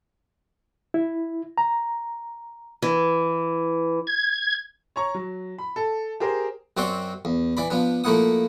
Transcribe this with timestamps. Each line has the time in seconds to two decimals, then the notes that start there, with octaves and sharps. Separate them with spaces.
0.94 E4
1.58 A#5
2.82 E3
4.07 G#6
4.96 C#5 A#5 C#6
5.14 F#3
5.58 B5
5.76 A4
6.20 G4 G#4 A#4 C5
6.77 F#2 C4 F#4 D5 F#5 C6
7.25 E2
7.57 E3 D5 B5
7.70 F3 B3 D4
8.04 F3 A3 A#3 E4 F#5 D#6